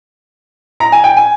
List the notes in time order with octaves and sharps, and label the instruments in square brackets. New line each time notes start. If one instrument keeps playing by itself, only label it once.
[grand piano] A#5
G#5
G5
G#5